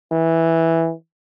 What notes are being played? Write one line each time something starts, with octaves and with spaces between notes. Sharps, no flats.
E3